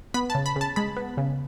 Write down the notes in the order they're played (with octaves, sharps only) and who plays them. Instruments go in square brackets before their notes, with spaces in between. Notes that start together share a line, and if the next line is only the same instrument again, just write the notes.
[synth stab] B3 B5
A5
C#3
B5
C#3 A5
G#3 B5
B3
C#3